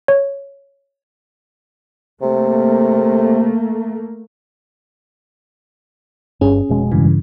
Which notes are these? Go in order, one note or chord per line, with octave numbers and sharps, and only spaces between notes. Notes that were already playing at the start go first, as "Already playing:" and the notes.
C#5
C3 A3 A#3
G1 G2 C#4 G#4
F1 B2 G#3
G2 C#3 E3